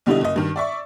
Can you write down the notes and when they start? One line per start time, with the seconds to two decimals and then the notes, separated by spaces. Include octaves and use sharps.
0.06 B1 D3 G3 E4 G4 D#5
0.21 F#1 D#5
0.36 G2 D#3
0.56 D5 E5 C#6